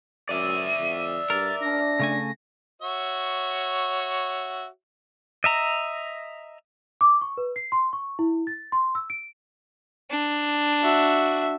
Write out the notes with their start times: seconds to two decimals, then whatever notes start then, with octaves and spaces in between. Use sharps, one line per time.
0.29 F#2 D5 E5 D#7
0.78 F2
1.30 G2 A#4 A6
1.61 D4 A#6
2.00 C#3 A3 G#5
2.82 F#4 C#5 E5
5.44 D#5 E5 A#5
7.01 D6
7.21 C#6
7.37 B4
7.56 C7
7.72 C6
7.93 C#6
8.19 E4
8.47 A6
8.72 C6
8.95 E6
9.10 D7
10.10 D4
10.82 F#4 E5